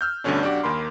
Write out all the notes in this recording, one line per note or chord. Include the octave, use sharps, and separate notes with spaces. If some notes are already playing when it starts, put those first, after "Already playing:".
E6 F6 G6
D2 G2 B2 D3 C#4 D4
B1 D4 F#4 G4 D6
D#2 D#3 A#3 B5 C6